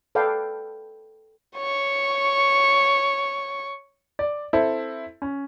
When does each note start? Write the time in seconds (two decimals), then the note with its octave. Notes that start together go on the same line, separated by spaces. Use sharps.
0.15 A4 B4 D5 F5 G5
1.57 C#5 C#6
4.19 D5
4.53 C4 E4 A4
5.22 C#4